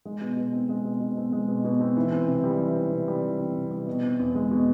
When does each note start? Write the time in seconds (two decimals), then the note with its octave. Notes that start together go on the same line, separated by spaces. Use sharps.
0.05 G#3
0.21 B2
0.37 B2
0.53 C4
0.69 G#3
0.85 B2
1.01 B2
1.17 C4
1.32 G#3
1.48 B2
1.64 B2
1.81 C4
1.97 E3
2.12 C4
2.28 C3
2.44 G3
2.60 E3
2.75 C4
2.92 C3
3.08 G3
3.23 E3
3.39 C4
3.55 C3
3.71 G3
3.87 B2
4.03 C4
4.19 E2
4.35 G#3
4.51 B2